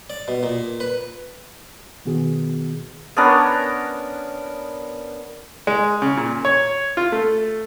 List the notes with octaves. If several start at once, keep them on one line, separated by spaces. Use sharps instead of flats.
D5
B2
A#2
B4
B2 D#3 B3 F#4 G#4
B3 C#4 D4 A#4
G#3
C#3
A#2
C#5
F4
A3